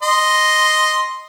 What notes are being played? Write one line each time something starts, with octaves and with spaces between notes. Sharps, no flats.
D#5 C6